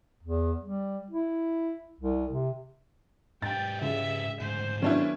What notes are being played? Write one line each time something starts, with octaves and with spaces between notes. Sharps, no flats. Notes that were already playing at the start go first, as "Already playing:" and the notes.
E2
G3
E4
C2
C3
G#2 G4 G5 A6
C#3 G#3 E5
D2 G#2 C5
D#3 F#3 B3 C#4 D4 E4